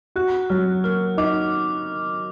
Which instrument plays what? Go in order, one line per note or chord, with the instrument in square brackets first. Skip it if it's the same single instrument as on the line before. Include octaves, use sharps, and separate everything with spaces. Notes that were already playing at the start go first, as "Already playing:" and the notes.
[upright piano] F#4 [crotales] F#6
[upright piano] F#3 [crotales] F6
[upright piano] A#3 [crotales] F6
[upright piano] D#4 [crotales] D6